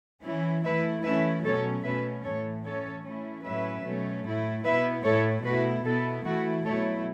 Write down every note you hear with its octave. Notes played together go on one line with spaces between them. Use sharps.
E3 C#4 E4
E3 A3 E4 B4 E5
E3 A3 C#4 E4 B4 E5
B2 F#3 A3 C#4 A4 C#5
B2 F#3 A3 C#4 B4 E5
A2 E3 A3 A4 C#5
E3 A3 C#4 A4 C#5
E3 A3 C#4 E4
A2 F#3 C#4 E4 B4 E5
B2 F#3 A3 C#4
A2 A3 E4
B2 B3 E4 B4 E5
A2 A3 E4 A4 C#5
B2 A3 E4 F#4 B4
B2 B3 E4 A4
E3 A3 E4 F#4
B2 F#3 A3 E4 A4 C#5